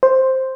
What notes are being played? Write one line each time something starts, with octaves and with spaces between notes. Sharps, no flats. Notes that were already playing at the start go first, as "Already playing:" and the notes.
C5